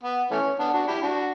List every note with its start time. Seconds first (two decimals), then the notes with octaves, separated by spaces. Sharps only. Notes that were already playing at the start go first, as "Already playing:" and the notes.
0.03 B3
0.31 E3 A3 C#4
0.59 B3 D4
0.74 D4 F#4
0.88 E4 G4
1.02 D4 F#4